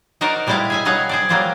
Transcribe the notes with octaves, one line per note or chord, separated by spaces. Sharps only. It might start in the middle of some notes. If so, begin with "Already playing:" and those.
D#4 F#4 A#4 C5 D5 D#5
B2 G3 G#3 E4 F5 A5
G#4 E5 G#5
F#3 G3 G#4 D#5 F5 F#5
G#4 C5 D5
F#3 G3 A#3 F4 C5 D5